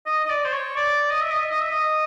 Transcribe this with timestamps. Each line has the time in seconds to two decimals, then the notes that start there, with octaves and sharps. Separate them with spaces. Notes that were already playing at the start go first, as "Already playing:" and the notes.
0.07 D#5
0.25 D#5
0.30 D5
0.45 C5
0.53 C#5
0.76 D5
1.11 D#5
1.21 E5
1.30 D#5
1.41 E5
1.51 D#5
1.61 E5
1.71 D#5